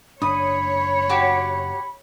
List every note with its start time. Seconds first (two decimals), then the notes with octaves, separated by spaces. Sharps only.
0.22 F#1 D4 C#5 B5 D#6
1.09 F#4 G4